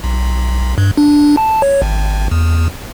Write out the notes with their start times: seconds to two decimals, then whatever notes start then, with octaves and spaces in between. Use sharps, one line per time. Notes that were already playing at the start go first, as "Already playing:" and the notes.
0.04 B1
0.78 G2
0.97 D4
1.37 A5
1.62 C#5
1.82 G#1
2.31 E2